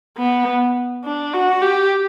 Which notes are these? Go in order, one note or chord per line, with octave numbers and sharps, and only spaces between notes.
B3
D4
F#4
G4